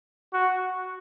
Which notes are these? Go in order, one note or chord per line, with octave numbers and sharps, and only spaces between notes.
F#4